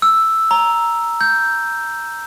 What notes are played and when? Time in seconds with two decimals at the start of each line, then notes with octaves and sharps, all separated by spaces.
0.02 E6
0.51 A#5
1.21 G6